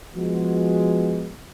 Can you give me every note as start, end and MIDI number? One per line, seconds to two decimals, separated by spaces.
0.15 1.32 53
0.15 1.32 56
0.15 1.32 59
0.15 1.32 66